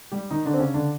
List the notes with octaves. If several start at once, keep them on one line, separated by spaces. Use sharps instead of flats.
G3 G4
D#3 D#4
D3 D4
C4
C#3 C#4
D3 D4